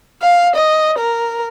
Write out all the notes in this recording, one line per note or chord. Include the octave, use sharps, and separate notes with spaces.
F5
D#5
A#4